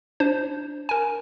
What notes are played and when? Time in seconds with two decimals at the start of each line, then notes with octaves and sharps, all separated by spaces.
0.20 D4 C5
0.89 A#4 G#5